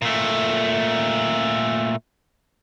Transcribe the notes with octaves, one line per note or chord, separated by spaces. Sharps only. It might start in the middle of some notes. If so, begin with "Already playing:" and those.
A#2 A3